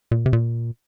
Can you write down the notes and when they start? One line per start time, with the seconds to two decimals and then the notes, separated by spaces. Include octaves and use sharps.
0.11 A#2
0.26 C3
0.33 A#2